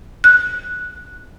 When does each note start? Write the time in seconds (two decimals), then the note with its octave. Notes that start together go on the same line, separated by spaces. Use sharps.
0.24 F#6